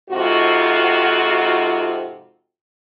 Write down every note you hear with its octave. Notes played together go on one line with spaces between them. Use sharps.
F2 G#2 C3 F4 F#4